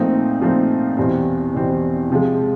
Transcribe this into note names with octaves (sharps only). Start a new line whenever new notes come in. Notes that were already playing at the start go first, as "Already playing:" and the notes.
Already playing: A#2 F3 A3 C4 D#4
A#2 F3 A3 C4 D#4
E2 B2 G3 C4
E2 B2 G3 C4
C3 F3 G#3